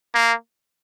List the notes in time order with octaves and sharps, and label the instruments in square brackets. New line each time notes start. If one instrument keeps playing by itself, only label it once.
[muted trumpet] A#3